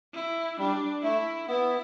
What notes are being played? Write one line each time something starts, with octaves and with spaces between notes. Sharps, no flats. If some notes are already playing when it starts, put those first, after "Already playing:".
E4
G3 D4
A3 E4
B3 E4